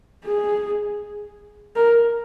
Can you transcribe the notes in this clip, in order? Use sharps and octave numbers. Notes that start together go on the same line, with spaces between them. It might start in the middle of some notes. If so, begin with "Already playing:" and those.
G#4
A#4